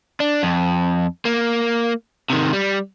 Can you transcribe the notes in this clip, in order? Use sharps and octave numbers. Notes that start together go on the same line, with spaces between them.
D4
F2
A#3
C3 D#3
G3